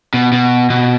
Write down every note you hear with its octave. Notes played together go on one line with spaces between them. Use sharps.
B2
B2
B2